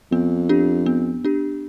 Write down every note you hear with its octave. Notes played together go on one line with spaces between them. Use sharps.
F2 B3
D4 G4
B3
D4 G4